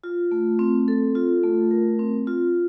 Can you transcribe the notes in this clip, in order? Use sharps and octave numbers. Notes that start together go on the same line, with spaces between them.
F4
A3
C4
A4
F4
A3
A#4
C4
F4